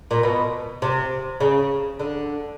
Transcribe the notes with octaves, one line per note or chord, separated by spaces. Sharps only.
A#2
B2
C3
C#3
D3